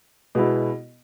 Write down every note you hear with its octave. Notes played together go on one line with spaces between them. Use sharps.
B2 G#3 B3 E4